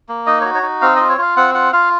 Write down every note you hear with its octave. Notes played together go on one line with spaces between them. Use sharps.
A#3
D#4 D#5
F#4 C#5
C#5
D#4
C4 F5
F4 D#5
C#5
F4 F5
C4 F#5
F4 F#5
F4 F5